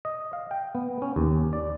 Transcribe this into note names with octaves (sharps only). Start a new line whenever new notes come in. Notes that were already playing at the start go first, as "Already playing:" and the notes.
D#5
F5
G5
B3
C#4
D#2
D5